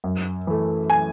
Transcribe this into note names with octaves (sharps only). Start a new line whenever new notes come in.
F#2
E3 A3
G#5